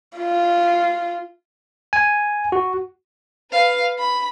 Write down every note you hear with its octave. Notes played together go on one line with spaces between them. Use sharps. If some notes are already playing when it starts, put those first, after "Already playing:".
F4
G#5
F#4
B4 F5
B5